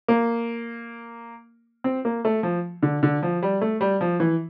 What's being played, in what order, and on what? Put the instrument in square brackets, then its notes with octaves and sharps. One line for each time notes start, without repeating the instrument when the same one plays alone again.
[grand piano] A#3
C4
A#3
A3
F3
D3
D3
F3
G3
A3
G3
F3
E3